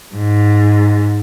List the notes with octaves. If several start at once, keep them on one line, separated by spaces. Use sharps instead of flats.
G#2